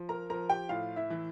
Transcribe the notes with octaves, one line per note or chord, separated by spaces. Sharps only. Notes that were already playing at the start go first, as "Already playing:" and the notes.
Already playing: F3
A#4 A#5
F3 A#4 A#5
G4 G5
A2 F4 F5
E4 E5
E3